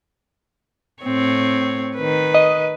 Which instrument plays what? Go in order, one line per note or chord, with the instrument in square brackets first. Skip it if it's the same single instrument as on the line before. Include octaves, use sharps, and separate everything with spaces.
[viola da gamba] A2 C4 C#5
D#3 B4
[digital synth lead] D#5